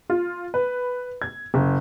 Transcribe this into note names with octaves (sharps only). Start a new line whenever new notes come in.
F4
B4
G#6
F#1